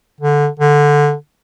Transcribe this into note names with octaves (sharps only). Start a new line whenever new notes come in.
D3
D3